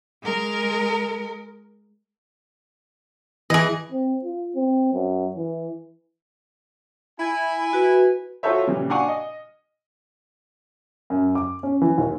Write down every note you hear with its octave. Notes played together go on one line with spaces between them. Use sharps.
G#3 A#4
E3 G#4 D#5
C4
F4
C4
F#2
E3
E4 G#5
F#4 B4
F4 F#4 A4 C5 C#5 E5
A#2 C#3 E3 G3
D4 F5 F#5 G#5 C#6
D#5
F#2
D6
C#4
E3
D#2